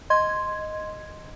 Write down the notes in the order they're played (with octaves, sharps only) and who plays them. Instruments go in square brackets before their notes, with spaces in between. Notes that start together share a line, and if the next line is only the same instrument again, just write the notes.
[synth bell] D#5 C6 G#6